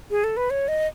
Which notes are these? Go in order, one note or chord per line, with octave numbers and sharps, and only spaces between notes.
G#4
A4
B4
C#5
D#5